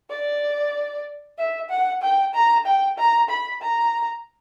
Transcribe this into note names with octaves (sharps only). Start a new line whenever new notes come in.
D5
E5
F#5
G5
A#5
G5
A#5
B5
A#5